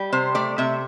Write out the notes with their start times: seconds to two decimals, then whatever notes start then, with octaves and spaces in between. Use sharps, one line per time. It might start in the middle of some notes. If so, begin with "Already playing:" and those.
Already playing: G3
0.13 C3 C5
0.35 A3 D5
0.58 C3 E5